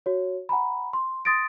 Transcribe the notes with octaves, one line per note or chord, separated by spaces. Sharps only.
F#4 C#5
F#5 G#5 A#5 B5
C6
C6 D#6 A6 A#6 D7